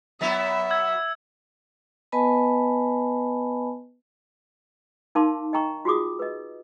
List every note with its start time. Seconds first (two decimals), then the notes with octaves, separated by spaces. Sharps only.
0.21 F#3 B3 E4 E5
0.71 E6 G#6
2.12 B3 B4 D#5 G#5 A5 B5
5.15 D#4 A#4 F5 A5 C6 D6
5.53 D#5 G5 A#5 C#6
5.85 F4 F#4 G#4 D6 D#6
6.19 B4 D#5